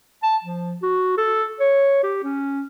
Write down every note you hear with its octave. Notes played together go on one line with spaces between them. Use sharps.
A5
F3
F#4
A4
C#5
G4
C#4